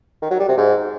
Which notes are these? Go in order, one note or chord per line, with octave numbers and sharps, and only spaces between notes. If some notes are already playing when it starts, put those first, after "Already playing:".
D#3
F#3
G3
C3
G#2